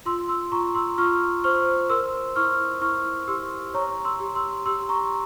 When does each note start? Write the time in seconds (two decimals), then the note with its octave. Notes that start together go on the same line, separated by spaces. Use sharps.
0.06 F4 C6 E6
0.28 C6 E6
0.52 F4 A#5 C#6
0.75 C6 E6
0.98 F4 C#6 F6
1.44 C5 C#6 F6
1.89 A#4 C6 E6
2.36 E4 C#6 F6
2.81 E4 C#6 F6
3.28 G4 C6 E6
3.74 C#5 A#5 C#6
4.05 C6 E6
4.20 G4
4.35 C6 E6
4.66 G4 C6 E6
4.89 A#5 C#6